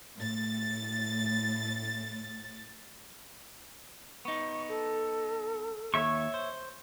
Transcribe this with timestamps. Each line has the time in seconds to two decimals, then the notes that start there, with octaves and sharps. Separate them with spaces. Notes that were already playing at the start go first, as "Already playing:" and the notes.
0.16 A2 A6
4.25 B3 D#4 C#6
4.69 A4
5.94 D#2 C#5 E5 C#6
6.34 C5